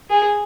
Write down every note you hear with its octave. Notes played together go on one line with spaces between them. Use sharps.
G#4